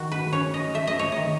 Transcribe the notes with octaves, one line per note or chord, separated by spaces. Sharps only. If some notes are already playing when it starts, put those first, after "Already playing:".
Already playing: D#3 F#4
B4
C#4 C#5
D#5
A3 E5
D#5
C#5
D#3 D#5